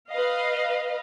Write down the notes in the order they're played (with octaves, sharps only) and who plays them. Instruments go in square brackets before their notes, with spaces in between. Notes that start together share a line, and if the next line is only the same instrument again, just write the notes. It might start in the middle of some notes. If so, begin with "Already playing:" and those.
[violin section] B4 D#5 F5